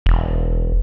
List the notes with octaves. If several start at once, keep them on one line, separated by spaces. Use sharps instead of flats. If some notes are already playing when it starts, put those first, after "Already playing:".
E1